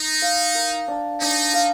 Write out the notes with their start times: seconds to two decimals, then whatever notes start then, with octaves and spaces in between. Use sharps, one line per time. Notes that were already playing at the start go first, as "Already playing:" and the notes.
Already playing: D#4
0.22 F5
0.55 A#4
0.88 D4
1.21 D4 D#4
1.54 F5